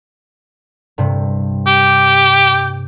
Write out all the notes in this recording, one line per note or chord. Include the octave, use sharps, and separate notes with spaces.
G2 C3
G4